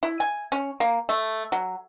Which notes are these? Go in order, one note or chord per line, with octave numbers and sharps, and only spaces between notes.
E4
G#5
C#4
A#3
A3
F#3